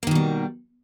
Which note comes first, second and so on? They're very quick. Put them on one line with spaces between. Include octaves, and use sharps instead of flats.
A#3 D#3 B2 G3